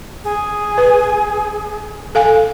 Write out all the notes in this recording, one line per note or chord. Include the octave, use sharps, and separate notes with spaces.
G#4
B4
A4 F5 G#5